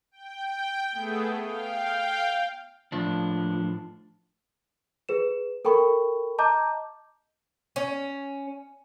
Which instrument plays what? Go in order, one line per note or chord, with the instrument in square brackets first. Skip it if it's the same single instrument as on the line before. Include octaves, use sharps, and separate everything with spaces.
[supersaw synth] G5
A3 B3 G#4 A4
F5 G5
[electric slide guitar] A2 F3 D4
[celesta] G#4 B4 E7
A4 A#4 G5 B5 C#6
D#5 A5 A#5 D6 G6
[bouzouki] C#4